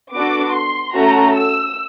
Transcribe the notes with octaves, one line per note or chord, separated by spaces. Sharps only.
B3 D4 F#4 A4 D6
C6
A3 C#4 F#4 A4 A#5
E6